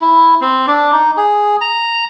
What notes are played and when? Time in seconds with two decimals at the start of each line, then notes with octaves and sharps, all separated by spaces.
0.02 E4
0.41 C4
0.67 D4
0.92 D#4
1.17 G#4
1.61 A#5